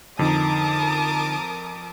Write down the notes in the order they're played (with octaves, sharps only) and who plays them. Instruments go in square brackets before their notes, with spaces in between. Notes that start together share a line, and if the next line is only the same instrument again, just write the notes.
[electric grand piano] F2 [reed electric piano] D3 D#4 [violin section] A#4 D6 D#6 [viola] A5